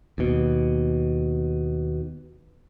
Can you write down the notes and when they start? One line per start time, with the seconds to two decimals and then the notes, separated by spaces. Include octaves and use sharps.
0.18 D#2 B2